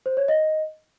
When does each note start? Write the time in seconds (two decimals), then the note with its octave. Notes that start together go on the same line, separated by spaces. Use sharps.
0.06 C5
0.17 C#5
0.28 D#5